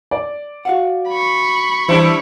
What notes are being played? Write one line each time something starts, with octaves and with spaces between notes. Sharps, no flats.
D5
F#4 F5 F#5
B5 C#6
E3 G3 D4 E4 C5